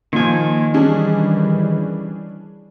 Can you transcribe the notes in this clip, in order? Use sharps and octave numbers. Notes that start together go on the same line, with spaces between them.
A#2 D#3 F3 G#5
E3 G3 C#4 D4 G#4